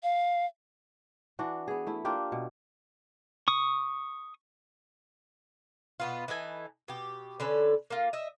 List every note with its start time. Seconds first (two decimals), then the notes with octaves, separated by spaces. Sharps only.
0.03 F5
1.39 E3 D4 F#4
1.68 B3 G#4
1.87 A3 E4
2.05 A#3 D4 F4 G4
2.32 B2
3.48 C#6 D#6
6.00 B2 B3 F4
6.28 E3 D#4 A4 G#5
6.88 B2 G4
7.40 D3 C#4 A4 B4
7.90 A#3 F4
8.13 D#5 E5